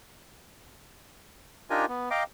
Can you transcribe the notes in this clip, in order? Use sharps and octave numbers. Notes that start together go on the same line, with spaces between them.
D4 D#4 F4 G4 A#4 G#5
B3
D#5 F5 G5 A#5 D6